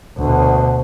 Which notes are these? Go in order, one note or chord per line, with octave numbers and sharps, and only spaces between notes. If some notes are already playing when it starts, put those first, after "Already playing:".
D2 B2